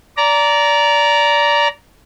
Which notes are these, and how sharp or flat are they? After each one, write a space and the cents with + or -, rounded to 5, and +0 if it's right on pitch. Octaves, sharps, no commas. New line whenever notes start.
D5 -20 A#5 +0